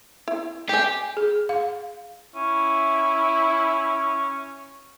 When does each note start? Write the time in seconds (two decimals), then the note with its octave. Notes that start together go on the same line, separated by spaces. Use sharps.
0.28 E4
0.69 G4 G5 G#5
1.17 G#4
1.49 F5
2.36 C#4 E4